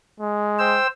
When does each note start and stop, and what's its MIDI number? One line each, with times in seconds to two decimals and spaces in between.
0.20 0.78 56
0.59 0.87 72
0.59 0.87 79
0.59 0.87 88